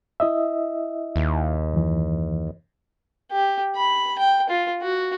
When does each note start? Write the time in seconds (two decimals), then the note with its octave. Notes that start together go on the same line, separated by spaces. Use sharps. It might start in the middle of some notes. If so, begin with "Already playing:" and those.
0.20 E4 D#5 E5
1.16 D#2
1.74 F#2 E3
3.31 G4
3.76 B5
4.19 G5
4.49 F4
4.82 F#4